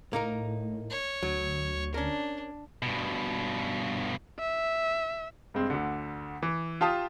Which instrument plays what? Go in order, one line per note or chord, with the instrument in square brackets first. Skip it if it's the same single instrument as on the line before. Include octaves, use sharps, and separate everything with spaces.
[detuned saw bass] A2 [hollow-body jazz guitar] A#3 D#4 A#4
[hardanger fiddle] C#5
[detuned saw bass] D2 [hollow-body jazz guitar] F#3
[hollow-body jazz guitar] C#4 A#4 [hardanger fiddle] D4
[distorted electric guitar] G2 B2
[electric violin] E5
[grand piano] G2 G#3 C4
D2 D3
E3
F4 G4 F5 A5 D#6